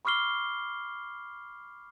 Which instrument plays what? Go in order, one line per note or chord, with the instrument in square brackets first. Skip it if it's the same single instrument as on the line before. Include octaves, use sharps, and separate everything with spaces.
[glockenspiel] B5 C#6 D6 F6 C7 G7